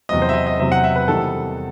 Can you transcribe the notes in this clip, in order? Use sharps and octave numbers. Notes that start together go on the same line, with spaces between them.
E2 C3 F#3 C4 D#5
C5
E5
D#5
D#5
E2 C3 F#3 C4 E5
F#5
E5
B4
E2 C3 D#3 G3 A4